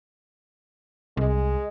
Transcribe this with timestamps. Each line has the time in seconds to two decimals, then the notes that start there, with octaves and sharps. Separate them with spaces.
1.17 C2 G#3